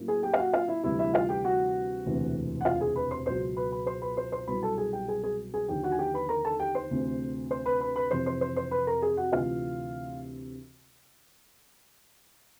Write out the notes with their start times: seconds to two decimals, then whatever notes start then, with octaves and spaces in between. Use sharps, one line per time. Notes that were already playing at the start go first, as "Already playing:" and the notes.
Already playing: A2 F#3 A#3 C#4 E4
0.08 G#4 G#5
0.23 G4 G5
0.34 F5
0.39 F#4 F#5
0.53 F4 F5
0.68 E4 E5
0.84 D2 C3 E3 G3 E4 E5
0.99 E4 E5
1.14 F4 F5
1.29 G4 G5
1.44 F#4 F#5
2.05 E1 D2 C3 E3 A3
2.61 F#5
2.65 F4 F5
2.81 G#4 G#5
2.96 B4 B5
3.11 C5 C6
3.26 C#2 B2 F#3 C5 C6
3.57 B4 B5
3.72 B4 B5
3.86 C5 C6
4.02 B4 B5
4.17 C5 C6
4.32 C5 C6
4.47 C2 B2 F#3 B4 B5
4.63 A4 A5
4.78 G#4 G#5
4.93 G4 G5
5.08 G#4 G#5
5.24 G#4 G#5
5.54 G#4 G#5
5.68 D#2 D3 F3 G4 G5
5.83 F#4 F#5
5.92 G#5
5.99 G4 G5
6.14 B4 B5
6.29 A#4 A#5
6.45 A4 A5
6.60 G4 G5
6.75 C5 C6
6.90 D2 C3 E3 A3 C4
7.51 C5 C6
7.66 B4 B5
7.81 B4 B5
7.96 B4 B5
8.11 F2 C3 E3 C5 C6
8.26 C5 C6
8.41 C5 C6
8.56 C5 C6
8.71 B4 B5
8.87 A#4 A#5
9.02 G#4 G#5
9.17 F#4 F#5
9.32 D2 C3 E3 F4 F5